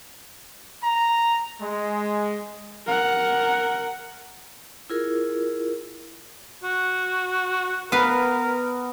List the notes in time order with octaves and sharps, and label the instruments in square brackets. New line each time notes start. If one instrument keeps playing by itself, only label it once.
[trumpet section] A#5
G#3
[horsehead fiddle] A#4 F#5
[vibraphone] E4 F4 G#4 A#4
[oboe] F#4
[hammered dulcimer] B3 [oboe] A#4 [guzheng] B4 F5